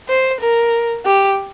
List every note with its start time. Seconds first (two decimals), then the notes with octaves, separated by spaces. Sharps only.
0.09 C5
0.41 A#4
1.05 G4